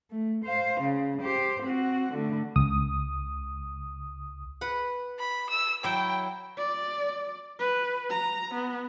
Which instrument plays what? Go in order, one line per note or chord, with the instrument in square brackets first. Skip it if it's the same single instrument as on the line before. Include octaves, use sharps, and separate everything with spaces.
[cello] A3
C5 F5
C#3
G4 C5
C4 F#4
D3 A3
[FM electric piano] C#2 D#6
[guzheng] B4 F#5
[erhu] B5
E6
[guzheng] F#3 E4 [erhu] G5
[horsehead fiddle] D5
B4
A#5
B3